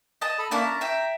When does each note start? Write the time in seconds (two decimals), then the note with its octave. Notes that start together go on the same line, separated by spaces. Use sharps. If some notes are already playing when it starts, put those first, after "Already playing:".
0.21 D#5 A5
0.38 A4 B5
0.51 A#3 C#4 D4 E4 A5
0.65 A#5
0.81 E5 G5